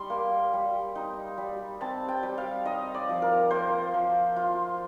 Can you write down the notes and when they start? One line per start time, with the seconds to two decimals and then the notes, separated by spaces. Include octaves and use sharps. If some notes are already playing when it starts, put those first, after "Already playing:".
Already playing: G3 D#4 C6
0.10 A#3
0.53 G3
0.95 D#4
1.38 G3
1.81 C4 A5
2.08 G5
2.23 G3
2.38 F5
2.65 D#4 D#5
2.94 D5
3.09 F3
3.22 A#4
3.51 A#3 C5
3.94 F3
4.36 F4